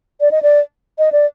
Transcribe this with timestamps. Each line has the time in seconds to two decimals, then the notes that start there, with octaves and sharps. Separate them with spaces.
0.21 D5
0.31 D#5
0.43 D5
0.99 D#5
1.12 D5